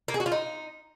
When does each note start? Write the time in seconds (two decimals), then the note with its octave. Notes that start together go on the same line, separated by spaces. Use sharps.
0.08 A#3
0.14 G#4
0.20 F#4
0.26 F4
0.32 D#4